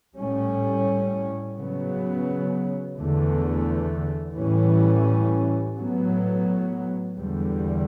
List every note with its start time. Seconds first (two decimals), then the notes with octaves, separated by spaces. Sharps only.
0.19 A2 G3 C#4
1.58 C#3 F#3 B3
2.98 E2 D3 A3
4.38 A2 E3 G3 C#4
5.77 A2 F#3 B3
7.17 E2 D3 G3